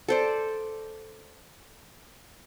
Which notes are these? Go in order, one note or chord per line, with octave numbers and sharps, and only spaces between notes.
A4 C5 D5